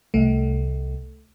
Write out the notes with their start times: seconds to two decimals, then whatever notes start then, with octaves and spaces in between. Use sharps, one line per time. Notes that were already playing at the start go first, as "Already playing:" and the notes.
0.14 C2 A3